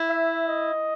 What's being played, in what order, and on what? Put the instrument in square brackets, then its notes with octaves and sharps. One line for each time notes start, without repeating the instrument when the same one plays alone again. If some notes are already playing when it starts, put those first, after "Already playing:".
Already playing: [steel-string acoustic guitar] E4
[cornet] E5
D#5